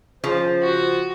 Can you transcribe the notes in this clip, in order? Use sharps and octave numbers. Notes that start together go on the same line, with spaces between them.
C#3 F3 C5
F#4